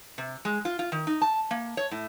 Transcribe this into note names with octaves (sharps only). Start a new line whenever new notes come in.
C3
G#3
F4
F4
D#3
D#4
A5
A#3
C#5
A2